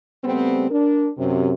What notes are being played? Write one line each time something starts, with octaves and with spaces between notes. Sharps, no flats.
C#3 G3 A3 B3 C4
D4 A#4
F#2 C3